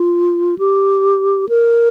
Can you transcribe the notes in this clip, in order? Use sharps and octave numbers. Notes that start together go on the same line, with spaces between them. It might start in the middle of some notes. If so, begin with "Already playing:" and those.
Already playing: F4
G4
A#4